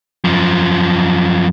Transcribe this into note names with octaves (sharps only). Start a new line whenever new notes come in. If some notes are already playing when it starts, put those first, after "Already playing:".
F#2 F3